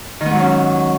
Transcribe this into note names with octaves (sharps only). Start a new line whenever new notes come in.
G#2 D#3 F#3 B3 C#4